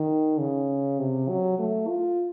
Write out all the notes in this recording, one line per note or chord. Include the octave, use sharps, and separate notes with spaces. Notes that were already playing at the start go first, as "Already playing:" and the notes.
Already playing: D#3
C#3
C3
F#3
A3
F4